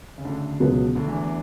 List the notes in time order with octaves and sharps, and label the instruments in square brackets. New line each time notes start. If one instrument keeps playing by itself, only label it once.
[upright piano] C#3
D2 D3
[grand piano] C#2 B2 F#3 B3
[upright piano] D2 D3
E2 E3